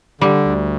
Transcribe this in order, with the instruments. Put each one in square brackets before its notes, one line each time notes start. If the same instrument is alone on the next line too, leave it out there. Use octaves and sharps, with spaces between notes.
[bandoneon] D3 [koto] G3
[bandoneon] D2